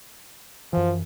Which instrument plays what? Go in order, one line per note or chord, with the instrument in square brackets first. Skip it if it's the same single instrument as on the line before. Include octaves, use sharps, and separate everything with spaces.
[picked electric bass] F#2 E3 [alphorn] F3